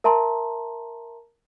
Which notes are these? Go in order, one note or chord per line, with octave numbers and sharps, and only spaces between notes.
A#4 E5 A5 A#5 C6